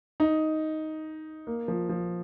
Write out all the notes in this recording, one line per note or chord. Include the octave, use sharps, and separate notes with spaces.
D#4
A#3
F3
F3